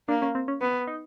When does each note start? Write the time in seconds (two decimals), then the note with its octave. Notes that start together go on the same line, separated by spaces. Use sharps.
0.08 A#3 D4
0.22 C#4
0.35 C4
0.48 C#4
0.61 B3
0.87 D#4